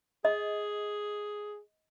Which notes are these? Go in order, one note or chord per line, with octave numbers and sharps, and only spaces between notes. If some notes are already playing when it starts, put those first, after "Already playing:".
G#4 D#5